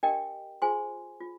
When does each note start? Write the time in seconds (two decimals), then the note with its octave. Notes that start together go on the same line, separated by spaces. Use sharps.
0.03 D4 G4 A#4 D#5 G5
0.62 F4 G#4 C5 G#5 C6
1.21 F4